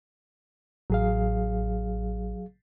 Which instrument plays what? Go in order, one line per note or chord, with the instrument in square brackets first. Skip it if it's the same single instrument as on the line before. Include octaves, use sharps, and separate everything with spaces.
[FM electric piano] A1 [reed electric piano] F#3 G#4 F5